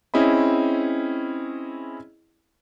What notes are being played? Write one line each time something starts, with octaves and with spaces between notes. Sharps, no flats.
C4 C#4 E4 G#4 D#5 B5